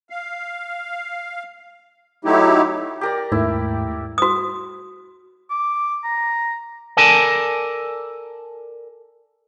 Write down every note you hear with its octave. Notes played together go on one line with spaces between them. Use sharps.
F5
F#3 A3 D#4 E4 G4
G4 A#4 D5
D#2 G#2 A3 E4
F#4 D#6
D6
A#5
A4 A#4 D5 G#5 A5